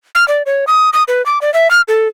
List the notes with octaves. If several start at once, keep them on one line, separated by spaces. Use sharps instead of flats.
F6
D5
C#5
D#6
D#6
B4
D6
D5
E5
F6
A4